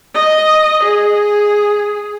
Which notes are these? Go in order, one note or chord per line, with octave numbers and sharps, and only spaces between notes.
D#5
G#4